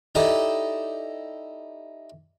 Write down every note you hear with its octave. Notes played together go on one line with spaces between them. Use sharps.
D#4 E4 G4 A4 D5 D#5